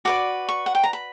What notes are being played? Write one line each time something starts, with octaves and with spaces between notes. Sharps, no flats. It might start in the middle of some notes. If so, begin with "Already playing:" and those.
F#4 B4 D5 D6
C#6
F#5
G5
A#5
B5